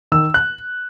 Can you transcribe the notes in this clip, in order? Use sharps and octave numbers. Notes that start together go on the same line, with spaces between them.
D#3 E6
F#6